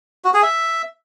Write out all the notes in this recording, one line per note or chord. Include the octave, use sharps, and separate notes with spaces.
F#4
G#4
E5